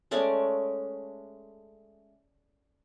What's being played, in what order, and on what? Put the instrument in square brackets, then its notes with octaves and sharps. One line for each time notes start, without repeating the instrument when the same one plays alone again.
[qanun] G#3 A3 C#4 D5